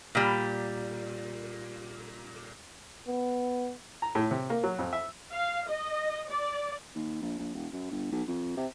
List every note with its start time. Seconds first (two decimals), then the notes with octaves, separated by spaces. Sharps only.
0.15 A#2 G3
3.07 B3
4.02 A#5
4.15 A2
4.31 C3
4.50 A#3
4.63 F#3
4.79 F2
4.93 E5
5.32 F5
5.69 D#5
6.30 D5
6.95 D#2
7.22 A#1
7.39 A#1
7.54 E1
7.73 F#2
7.90 G1
8.12 B1
8.28 F2
8.57 C3